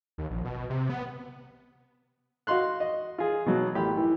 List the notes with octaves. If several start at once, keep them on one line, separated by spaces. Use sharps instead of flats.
D#2
A#1
B2
C3
B3
F#4 D#5 F5 C6 F#6
D#5
F4 G#4
B2 F#3
A1 G4 B5
E3